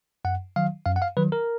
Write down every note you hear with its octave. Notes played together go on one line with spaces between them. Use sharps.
F#2 F#5
D#3 F#3 F5
F#2 F5
F#5
F5
D#3 F#3 B4
A#4